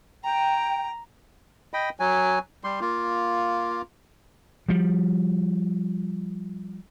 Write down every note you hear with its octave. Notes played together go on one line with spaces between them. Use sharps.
G5 A#5
D#5 G5 B5
F#3 G#5
G3 C6
A#3 F4
F3 G3